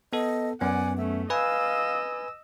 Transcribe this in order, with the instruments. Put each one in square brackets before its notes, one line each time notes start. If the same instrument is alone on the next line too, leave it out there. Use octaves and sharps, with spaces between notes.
[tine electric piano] B3 A4 [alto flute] D#5
[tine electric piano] F#2 B3 [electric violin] D5 F#5 [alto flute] G#5
[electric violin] A3 C#4 [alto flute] E5
[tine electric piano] B4 G#5 [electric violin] D#5 E6 [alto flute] F5